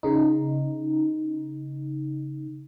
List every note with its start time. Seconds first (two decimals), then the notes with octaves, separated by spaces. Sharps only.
0.03 C#3 D#4